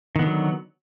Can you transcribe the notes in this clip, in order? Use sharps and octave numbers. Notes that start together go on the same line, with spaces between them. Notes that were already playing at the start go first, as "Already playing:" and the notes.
D3 D#3 F#3 B3